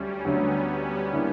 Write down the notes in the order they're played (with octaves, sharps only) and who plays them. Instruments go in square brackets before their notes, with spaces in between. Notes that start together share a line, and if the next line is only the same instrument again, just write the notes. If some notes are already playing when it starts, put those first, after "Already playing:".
Already playing: [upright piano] D2 F#3 [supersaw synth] G3 C#4
[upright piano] D2 D3 F#3 [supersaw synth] B3
[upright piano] D3 A#3 E4